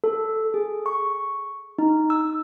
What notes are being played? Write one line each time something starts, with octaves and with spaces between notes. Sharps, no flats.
A4
G#4
C#6
D#4
E6